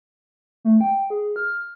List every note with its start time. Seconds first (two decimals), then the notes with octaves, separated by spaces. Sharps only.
0.65 A3
0.81 G5
1.10 G#4
1.36 F6